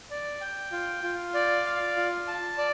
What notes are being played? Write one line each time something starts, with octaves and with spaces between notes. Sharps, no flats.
D5
G5
F4
F4
D5
F5
F4
A5
D5